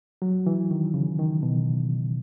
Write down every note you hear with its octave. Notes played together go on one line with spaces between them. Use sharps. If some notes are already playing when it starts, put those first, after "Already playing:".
F#3
E3
D#3
C#3
D#3
B2